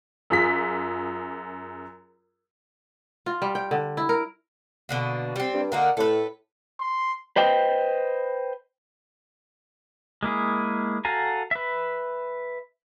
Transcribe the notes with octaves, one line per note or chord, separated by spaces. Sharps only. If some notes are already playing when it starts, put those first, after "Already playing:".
F#2 F4 G#4 B6
F4
G3
G5
D3
E4
A#4
B2 D3 A#3
G3 C4
G2
D3 A#3 D#4 A#4 F#5
A2 A4 B4
C6
B4 C5 D#5 G5
G#3 A#3 E4 G#4
F#4 A4 F5 G#5 A#5
B4 E5